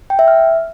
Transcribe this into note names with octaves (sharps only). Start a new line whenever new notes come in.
G5
E5
F6